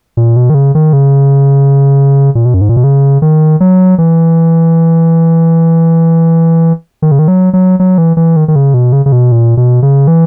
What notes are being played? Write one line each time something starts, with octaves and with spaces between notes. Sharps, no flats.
A#2
B2
D#3
C#3
D#3
C#3
A#2
B2
F#2
G#2
A#2
B2
C#3
D#3
F#3
E3
D#3
C#3
D#3
F#3
F#3
F#3
E3
E3
D#3
D#3
C#3
B2
C#3
C#3
B2
A#2
B2
C#3
E3